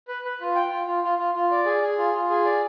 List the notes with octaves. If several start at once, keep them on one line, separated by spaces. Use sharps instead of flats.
B4
B4
F4
G5
F4
F4
F4
F4
F4
D5
G#4
G#4
F4
F4
G#4
D5